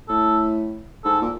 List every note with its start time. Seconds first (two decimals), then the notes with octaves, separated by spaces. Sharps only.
0.09 A2 A4
1.05 G#2 A4
1.22 A#2